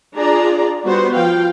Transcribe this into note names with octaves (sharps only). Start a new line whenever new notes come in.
D4 F4 G#4 D5 A#5
G3 B3 F#4 C5
F3 F5 G5